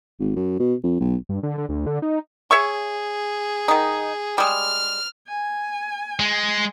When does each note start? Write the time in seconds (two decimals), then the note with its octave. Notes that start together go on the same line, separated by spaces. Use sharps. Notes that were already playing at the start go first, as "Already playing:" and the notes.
0.20 G#1
0.36 F#2
0.60 B2
0.84 F2
1.00 B1
1.29 G2
1.43 D3
1.58 D3
1.69 D2
1.86 D3
2.02 D#4
2.51 G#4 C#5 E5 C#6
3.68 D#3 D#4
4.38 G3 G#3 F6
5.27 G#5
6.19 G#3